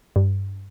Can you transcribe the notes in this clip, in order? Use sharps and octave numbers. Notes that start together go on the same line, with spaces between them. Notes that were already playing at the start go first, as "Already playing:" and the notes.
G2